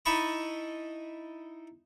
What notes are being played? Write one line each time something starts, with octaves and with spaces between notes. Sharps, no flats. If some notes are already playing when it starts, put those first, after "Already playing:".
D#4 E4 D#5 A5 B5 C#6